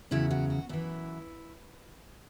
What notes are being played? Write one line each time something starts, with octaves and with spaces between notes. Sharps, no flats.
E2 C#3 F#3 E4
F#4
F#4
F#2 E3 E4